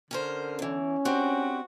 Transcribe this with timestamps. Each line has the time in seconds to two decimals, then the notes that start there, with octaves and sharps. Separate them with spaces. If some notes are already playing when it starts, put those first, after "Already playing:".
0.11 D3 C#4 A#4 C5
0.59 E2 E3 C#4
1.05 C4 D4 F#4 G4